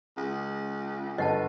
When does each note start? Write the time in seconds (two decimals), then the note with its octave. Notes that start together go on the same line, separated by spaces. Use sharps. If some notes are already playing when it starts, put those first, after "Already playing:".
0.17 C#2
1.18 G1 D#5 F#5 A5